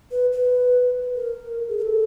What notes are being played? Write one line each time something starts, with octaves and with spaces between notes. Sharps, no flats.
B4
B4
A#4
G#4
A#4
A4